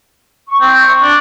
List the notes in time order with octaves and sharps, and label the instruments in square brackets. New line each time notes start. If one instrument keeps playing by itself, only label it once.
[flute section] C#6
[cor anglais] C4
D4